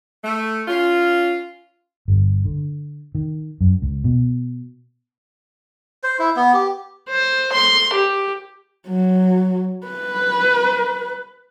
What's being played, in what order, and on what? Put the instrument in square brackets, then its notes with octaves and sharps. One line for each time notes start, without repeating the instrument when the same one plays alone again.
[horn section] A3
C#4 F4
[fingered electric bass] G1
D3
D#3
F#2
C#2
B2
[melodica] C5
E4
B3
G4
[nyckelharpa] C5
C6
G4
[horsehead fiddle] F#3
B4